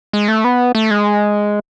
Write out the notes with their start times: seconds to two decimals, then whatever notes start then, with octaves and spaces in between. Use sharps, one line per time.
0.13 G#3
0.28 A3
0.44 B3
0.75 A3
0.91 G#3